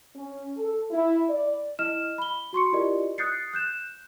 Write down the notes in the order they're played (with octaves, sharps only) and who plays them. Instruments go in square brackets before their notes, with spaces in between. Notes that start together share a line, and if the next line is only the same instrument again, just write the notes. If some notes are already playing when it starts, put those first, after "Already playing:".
[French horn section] C#4
A4
E4
D5
[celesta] E4 D#5 F6 E7
B5 G7
F#4 C6 C#6 C#7
E4 F4 G4 A#4 D5 D#5
D#6 F#6 G6 A6 C7 C#7
F#6 G6 E7